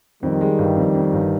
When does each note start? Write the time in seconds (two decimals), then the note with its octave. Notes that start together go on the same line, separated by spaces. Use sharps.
0.23 F2 D#3 G3
0.41 G#3
0.58 G1
0.76 F2
0.95 F2
1.13 G1